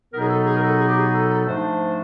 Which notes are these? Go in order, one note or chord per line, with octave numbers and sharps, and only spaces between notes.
B2 F#3 B3 D#4 A#4
G#4
A4
G#4
A#4
A4
G#4
G4
G#4
A4
A4
G#2 F3 A3 D4 C5